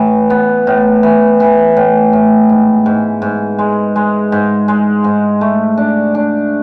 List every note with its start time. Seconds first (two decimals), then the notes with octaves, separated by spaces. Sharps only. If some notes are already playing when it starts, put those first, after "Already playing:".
Already playing: A2 E3
0.30 B3
0.67 A2
1.03 E3
1.40 E3
1.77 A2
2.13 A2
2.49 G#2
2.86 G#2
3.22 G#2
3.59 G#3
3.96 G#3
4.32 G#2
4.68 G#3
5.04 G#2
5.41 A3
5.77 D4
6.15 D4